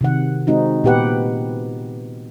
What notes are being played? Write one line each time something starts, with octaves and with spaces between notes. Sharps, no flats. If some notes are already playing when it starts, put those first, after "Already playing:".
C3 D#3 F#5
G#3 C4 D#4 F#4
A#2 B3 G4 B4 F#5